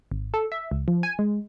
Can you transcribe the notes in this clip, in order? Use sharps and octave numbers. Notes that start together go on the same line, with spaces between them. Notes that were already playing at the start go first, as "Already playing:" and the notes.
G#1
A4
E5
C#2
F3
G#5
G#3